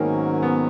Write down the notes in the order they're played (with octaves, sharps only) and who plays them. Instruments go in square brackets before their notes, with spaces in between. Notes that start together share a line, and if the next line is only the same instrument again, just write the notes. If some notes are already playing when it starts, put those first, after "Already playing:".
Already playing: [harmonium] G#2 D#3 F#3 C#4 [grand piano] A#3 B3
[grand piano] B3